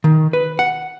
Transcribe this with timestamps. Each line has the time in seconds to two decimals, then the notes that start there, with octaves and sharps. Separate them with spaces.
0.04 D#3
0.33 B4
0.59 F#5